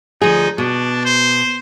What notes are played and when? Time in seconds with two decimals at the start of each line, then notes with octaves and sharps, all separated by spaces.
0.22 D2 F3 D#4 G#4
0.58 B2 D4
1.05 C5